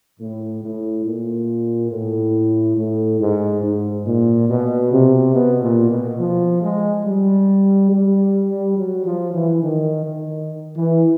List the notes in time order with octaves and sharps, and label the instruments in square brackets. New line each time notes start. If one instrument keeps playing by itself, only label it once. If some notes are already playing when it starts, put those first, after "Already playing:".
[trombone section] A2
A2
A#2
A2
A2
G#2
G#2
A#2
B2
C3
B2
A#2
B2
F3
G#3
G3
G3
F#3
F3
E3
D#3
D#3
E3